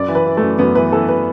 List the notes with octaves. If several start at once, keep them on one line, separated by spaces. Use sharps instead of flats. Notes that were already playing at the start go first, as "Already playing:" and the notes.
Already playing: F#2 D5
E3
B4
E3
F#2 A3
F#2 B3
E3 B4
E3 A4
B4